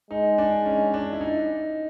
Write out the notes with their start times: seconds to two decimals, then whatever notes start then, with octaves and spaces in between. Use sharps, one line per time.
0.11 G#3 D#4
0.38 D4
0.66 C#4
0.94 D4
1.13 E4
1.21 D#4